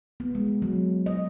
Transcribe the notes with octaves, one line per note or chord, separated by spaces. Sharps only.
B3
G#3
F#3
D#5